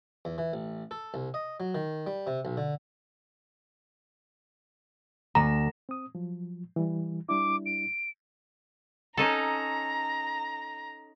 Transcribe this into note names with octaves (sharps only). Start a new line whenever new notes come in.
E2
E3
A1
A4
C2
D#5
F#3
D#3
G3
C3
B1
D3
D2 A#5
C4 D#6
F3 F#3
E3 G3
G3 D4 E4 D6
D7
C#4 D#4 A4 A#5